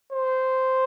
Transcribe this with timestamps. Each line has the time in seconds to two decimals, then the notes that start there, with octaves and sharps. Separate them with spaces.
0.12 C5